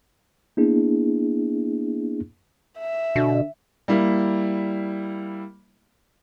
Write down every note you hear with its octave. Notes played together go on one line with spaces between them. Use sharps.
A#3 B3 D4 E4 G#4
E5
B2 D3
G3 A#3 E4